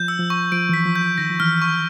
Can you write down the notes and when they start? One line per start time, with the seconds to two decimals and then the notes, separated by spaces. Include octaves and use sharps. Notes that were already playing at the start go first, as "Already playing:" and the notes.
Already playing: F3 G6
0.08 E6
0.19 F3
0.30 C#6
0.52 F3 D7
0.69 E3 B6
0.85 F3
0.95 G6
1.01 F3
1.18 D#3 A#6
1.30 F3
1.40 E3 F6
1.62 C#6